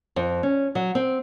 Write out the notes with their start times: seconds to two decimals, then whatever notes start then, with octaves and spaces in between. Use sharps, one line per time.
0.16 F2
0.43 C#4
0.75 F#3
0.95 C4